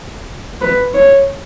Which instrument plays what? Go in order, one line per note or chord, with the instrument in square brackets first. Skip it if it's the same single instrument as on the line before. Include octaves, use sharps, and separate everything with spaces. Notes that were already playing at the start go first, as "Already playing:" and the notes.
[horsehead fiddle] B4
C#5